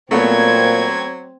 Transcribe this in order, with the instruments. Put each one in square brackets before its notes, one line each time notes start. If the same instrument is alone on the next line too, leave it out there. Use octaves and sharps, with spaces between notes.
[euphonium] A#2 [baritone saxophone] F#3 [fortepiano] A3 B3 C#5 [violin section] C4 G#6